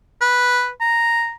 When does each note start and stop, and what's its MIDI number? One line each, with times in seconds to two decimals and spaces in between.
0.21 0.70 71
0.81 1.32 82